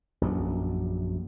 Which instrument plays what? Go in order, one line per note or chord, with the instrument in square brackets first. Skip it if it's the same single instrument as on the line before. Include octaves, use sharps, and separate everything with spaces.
[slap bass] A#1 F#2 F#3